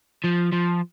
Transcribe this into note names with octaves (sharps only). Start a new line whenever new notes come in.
F3
F3